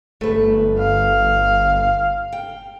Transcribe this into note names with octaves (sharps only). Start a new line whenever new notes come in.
G1 A3 B4
F5
G5